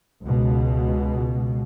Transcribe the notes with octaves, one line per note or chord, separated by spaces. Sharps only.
C#2 B2